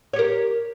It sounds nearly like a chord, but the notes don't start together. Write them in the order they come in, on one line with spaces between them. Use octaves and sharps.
C#5 G4 A#4